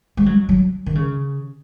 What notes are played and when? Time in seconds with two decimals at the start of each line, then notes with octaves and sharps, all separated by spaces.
0.17 G#3
0.26 F#3
0.49 F#3
0.86 D#3
0.95 C#3